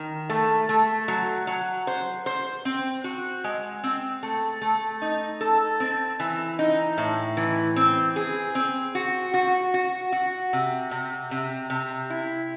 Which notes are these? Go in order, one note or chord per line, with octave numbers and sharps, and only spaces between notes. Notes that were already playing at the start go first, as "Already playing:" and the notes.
Already playing: D#3
A3
A3
F#3
F#3
C5
C5
C4
F#4
G#3
C4
A3
A3
D#4
A4
C4
E3
D#4
A2
E3
C4
G#4
C4
F#4
F#4
F#4
F#4
C3
C3
C3
C3
E4